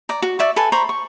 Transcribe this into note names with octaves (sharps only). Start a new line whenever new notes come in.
D5 A#5
F#4
D5 E5 C#6
A4 B4 G#5
C5 A#5 B5 C#6
C#6